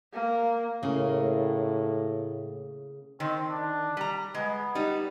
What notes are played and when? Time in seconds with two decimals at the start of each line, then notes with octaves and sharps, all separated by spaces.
0.13 A#3
0.83 A2 C#3 A#3 C#4
3.20 D#3 C4
3.50 D4
3.97 G3 A#5
4.35 G#3 B3
4.75 G3 D#4